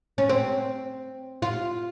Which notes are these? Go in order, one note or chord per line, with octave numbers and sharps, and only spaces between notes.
C#4
C4
F4